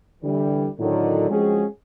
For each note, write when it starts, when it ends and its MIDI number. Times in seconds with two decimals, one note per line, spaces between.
0.23 0.68 50
0.23 0.68 52
0.23 0.68 55
0.79 1.28 45
0.79 1.28 50
0.79 1.28 51
0.79 1.28 54
1.30 1.65 53
1.30 1.65 56
1.30 1.65 60
1.30 1.65 61
1.30 1.65 66
1.30 1.65 68